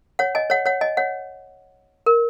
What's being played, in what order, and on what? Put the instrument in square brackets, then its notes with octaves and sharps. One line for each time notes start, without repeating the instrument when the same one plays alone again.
[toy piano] C#5 F#5
D#5 G#5
C#5 F#5
C#5 F#5
D#5 G#5
C#5 F#5
A#4